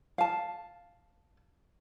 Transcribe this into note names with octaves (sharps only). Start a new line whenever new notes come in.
F5 A5